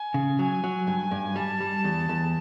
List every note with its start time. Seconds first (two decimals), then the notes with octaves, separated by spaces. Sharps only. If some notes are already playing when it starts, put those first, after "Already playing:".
Already playing: G#5
0.14 C#3
0.39 F#3 G#5
0.64 F#3
0.87 G2
1.11 G2
1.36 G3 A5
1.60 G3
1.84 E2
2.09 E2